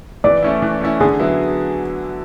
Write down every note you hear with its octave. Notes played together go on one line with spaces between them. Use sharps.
E3 D5
A3 C#4 E4
E3
A3 C#4 E4
D3 G#4
F#3 B3 E4